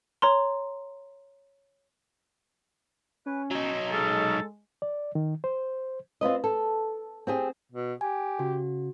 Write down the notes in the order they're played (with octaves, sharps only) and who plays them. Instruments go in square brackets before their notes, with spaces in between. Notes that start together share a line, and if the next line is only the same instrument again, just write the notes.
[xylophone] C#5 A#5 C6
[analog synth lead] C#4 [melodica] B4
[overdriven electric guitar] F#3 D#4 [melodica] C#5 E6
[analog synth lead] G#3 [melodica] C#4 G#4 C#6 [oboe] A4
[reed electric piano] D5
D#3
C5
[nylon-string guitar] C4 F4 B4 D#5
A4
C4 G4 G#4
[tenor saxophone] B2
[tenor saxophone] G4 [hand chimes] G#5
[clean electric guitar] C#3 [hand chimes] F#4